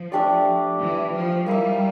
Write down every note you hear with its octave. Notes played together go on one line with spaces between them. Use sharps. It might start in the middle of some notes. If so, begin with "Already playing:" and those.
Already playing: F3
A3 D4 G4 D5
E3
F3
G3 A#3 E4 A#4 E5